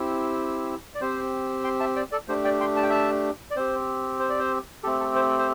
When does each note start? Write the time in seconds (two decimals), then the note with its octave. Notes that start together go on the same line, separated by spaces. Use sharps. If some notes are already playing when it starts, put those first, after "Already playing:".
Already playing: C4 E4 G4
0.95 D5
1.01 C4 G4 C5
1.64 G5 C6
1.80 E5 A5
1.96 D5 G5
2.12 A4 D5
2.28 A3 D4 G4 C5
2.45 D5 G5
2.61 G5 C6
2.77 A5
2.83 G5
2.90 E5 A5
3.51 D5
3.56 C4 G4 C5
4.19 C5
4.29 D5
4.39 C5
4.83 A3 C4 G4 A4
5.00 A4
5.15 C5
5.39 C5